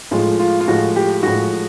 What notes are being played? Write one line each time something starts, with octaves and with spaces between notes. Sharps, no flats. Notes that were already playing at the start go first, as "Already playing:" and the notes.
A2 F3 G#3 F4
F4
F4
A2 F3 G#3 F#4
G4
A2 F3 G#3 F#4